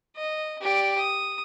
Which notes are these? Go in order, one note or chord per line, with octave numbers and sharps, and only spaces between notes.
D#5
G4 D5
D#6